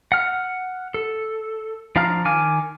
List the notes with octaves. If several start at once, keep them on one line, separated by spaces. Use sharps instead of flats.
F#5 F6
A4
F3 D4 F5 A#5 F6
D#3 G#5 D6 F6